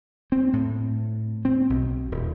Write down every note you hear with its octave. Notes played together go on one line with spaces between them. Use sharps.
C4
A2
C4
B1
D#1